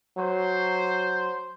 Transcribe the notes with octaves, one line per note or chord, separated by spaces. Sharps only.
F#3 C5